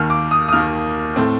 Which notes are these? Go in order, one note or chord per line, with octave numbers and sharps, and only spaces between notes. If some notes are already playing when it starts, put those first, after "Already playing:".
Already playing: D#2 D#3 A#3 F6
D6
D#6
D#6
D#2 D#3 A#3 F6
A2 A3 C4